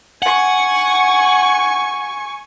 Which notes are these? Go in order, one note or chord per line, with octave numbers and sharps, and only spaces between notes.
F#5 G#5 C#6